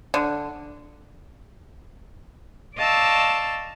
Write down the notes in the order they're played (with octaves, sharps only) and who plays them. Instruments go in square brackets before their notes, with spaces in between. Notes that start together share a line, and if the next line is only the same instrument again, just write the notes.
[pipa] D3
[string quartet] D5 D#5 F5 A5 C#6 E6